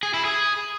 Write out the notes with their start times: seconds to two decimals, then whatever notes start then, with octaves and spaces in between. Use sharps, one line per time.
0.03 G#4
0.14 E4
0.25 G#4